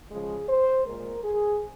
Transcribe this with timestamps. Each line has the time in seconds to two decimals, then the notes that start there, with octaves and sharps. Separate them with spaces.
0.12 C#3 F3 G#3 G#4
0.49 C5
0.87 A#2 G#3 A#4
1.25 G#4